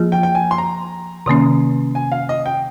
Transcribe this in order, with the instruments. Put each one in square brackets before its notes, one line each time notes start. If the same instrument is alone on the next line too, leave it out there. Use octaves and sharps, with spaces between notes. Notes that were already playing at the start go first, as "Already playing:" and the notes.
Already playing: [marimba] F3 A#3 F4 G#4
[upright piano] G5
G5
G#5
C6
A#5
[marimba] C3 D#3 A#3 C#4
[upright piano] G#5
F5
D#5
G5